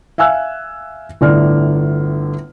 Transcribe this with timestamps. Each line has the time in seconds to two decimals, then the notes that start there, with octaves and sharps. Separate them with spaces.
0.18 E5 F5 G#5 E6 F#6
1.21 G1 A2 D3 D5 F6